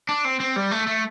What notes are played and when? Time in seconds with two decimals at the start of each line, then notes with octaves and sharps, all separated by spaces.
0.09 D4
0.25 C4
0.40 C4
0.56 G3
0.72 A3
0.87 A3